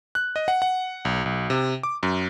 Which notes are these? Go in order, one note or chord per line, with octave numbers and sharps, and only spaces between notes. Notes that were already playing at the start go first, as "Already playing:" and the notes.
F#6
D#5
F#5
F#5
B1
B1
C3
D6
F#2